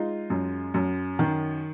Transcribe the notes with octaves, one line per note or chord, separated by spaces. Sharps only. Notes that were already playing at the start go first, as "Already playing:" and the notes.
Already playing: G#3 D#4 F4
F#2
F#2
D#3